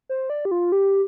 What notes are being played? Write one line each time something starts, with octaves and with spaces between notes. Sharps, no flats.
C5
D5
G4
F4
G4